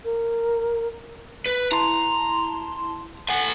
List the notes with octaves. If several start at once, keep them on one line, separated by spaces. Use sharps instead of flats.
A#4
B4
E4 A5 A#5 C6
A4 F#5 G#5